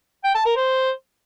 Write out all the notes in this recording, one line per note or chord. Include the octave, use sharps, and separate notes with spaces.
G5
A5
A#4
C5